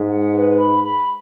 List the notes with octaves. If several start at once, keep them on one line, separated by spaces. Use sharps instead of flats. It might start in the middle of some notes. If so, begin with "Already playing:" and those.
Already playing: G#2
F#5
B4
B5
B5